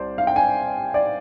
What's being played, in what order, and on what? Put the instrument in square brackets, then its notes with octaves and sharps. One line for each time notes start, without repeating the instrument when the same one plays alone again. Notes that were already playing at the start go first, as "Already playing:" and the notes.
Already playing: [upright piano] C2 C5 D5
F5
G5
G#5
D5